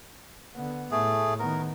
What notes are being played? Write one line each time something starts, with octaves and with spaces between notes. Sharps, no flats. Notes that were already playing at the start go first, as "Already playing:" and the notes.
D3 B3
A2 A3 G#4
D#3 B3 A#4